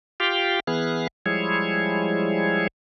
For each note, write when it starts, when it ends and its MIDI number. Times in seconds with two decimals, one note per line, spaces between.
0.20 0.60 65
0.20 0.60 67
0.20 0.60 77
0.20 0.60 79
0.67 1.07 52
0.67 1.07 59
0.67 1.07 68
0.67 1.07 89
0.67 1.07 90
1.26 2.67 53
1.26 2.67 55
1.26 2.67 56
1.26 2.67 64
1.26 2.67 68
1.26 2.67 73